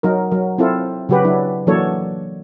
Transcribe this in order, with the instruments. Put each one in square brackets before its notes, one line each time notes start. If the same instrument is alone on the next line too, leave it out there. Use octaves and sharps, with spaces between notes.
[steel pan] F#3 D#4 A#4
F#3 A#4
C4 E4 F4 A4
C#3 F#3 F#4 G4 B4
F#3 D4 E4
E3 F#3 A#3 D4 A4 C#5